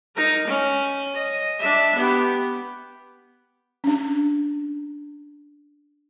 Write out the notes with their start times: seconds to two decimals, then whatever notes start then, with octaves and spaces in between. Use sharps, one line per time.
0.16 D#4 A#4
0.47 C#4
1.15 D#5
1.59 D4 E5
1.96 B3 G4
3.84 C#4 D4